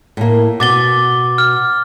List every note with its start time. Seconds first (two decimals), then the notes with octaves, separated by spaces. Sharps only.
0.17 A2 A#3
0.60 B2 D6 A6 G7
1.38 F6